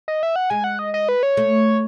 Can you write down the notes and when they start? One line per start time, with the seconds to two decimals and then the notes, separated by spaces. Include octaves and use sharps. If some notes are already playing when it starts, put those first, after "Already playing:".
0.08 D#5
0.23 E5
0.36 F#5
0.50 G#3 G#5
0.64 F#5
0.79 D#5
0.94 D#5
1.09 B4
1.23 C#5
1.37 A3